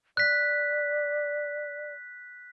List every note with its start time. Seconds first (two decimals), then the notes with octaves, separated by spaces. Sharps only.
0.17 D5 F#6 B6